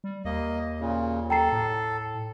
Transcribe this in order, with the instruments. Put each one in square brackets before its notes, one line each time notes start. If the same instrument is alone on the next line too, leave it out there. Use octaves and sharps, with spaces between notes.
[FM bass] G3
[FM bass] D#2 [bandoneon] A#3 D#5
[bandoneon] A#2 C#3
[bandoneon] A4 [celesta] G5 A#5 C7
[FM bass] A2